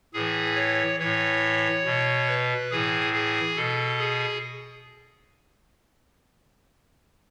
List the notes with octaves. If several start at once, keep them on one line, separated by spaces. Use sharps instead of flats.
A2 E3 G#4
C#5
A2 E3 C#5
B2
B4
A2 E3 G#4
G#4
B2 A4
G#4